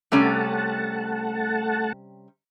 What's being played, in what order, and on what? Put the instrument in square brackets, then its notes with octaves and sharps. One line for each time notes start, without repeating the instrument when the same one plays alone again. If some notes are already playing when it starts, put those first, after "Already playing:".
[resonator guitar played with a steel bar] C3 G3 C#4 [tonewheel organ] A3 F#5 A5